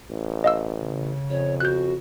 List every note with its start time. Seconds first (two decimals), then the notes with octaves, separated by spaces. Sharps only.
0.10 A1
0.44 D#5 F5 E6
0.82 C#3
1.30 F2 C#5
1.60 F#4 F#6 G6